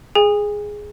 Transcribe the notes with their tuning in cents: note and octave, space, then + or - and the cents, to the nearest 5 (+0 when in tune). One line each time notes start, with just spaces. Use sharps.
G#4 +0 G#5 -35